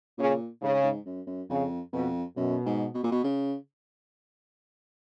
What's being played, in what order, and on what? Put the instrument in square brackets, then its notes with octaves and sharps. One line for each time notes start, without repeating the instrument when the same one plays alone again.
[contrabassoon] A#2 [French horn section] C#3
[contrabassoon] G#2 [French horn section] C#3
[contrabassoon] G#2
F#2
F#2
[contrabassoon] F2 [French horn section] C#3
[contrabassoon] F2 [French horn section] B2
[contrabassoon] F#2 [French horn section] B2
[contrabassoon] G#2
B2
A#2
B2
C#3